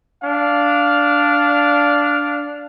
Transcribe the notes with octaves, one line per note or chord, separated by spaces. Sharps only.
D4 F5